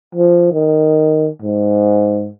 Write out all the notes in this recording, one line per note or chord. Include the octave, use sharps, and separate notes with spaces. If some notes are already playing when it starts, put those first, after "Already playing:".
F3
D#3
G#2